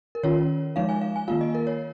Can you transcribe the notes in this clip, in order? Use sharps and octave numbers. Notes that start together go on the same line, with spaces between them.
A#4
D#3 C#4 F4 C#5
F3 G#3 D#4 F5
G#5
F5
G#5
D#3 A#3 F4 F5
D#5
A#4
C#5